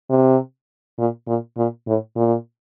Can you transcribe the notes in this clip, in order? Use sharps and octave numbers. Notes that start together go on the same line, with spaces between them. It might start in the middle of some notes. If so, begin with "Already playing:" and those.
C3
A#2
A#2
A#2
A2
A#2